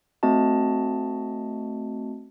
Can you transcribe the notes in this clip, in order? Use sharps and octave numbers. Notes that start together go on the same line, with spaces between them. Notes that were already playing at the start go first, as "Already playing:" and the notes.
A3 C4 F#4 D#5 A5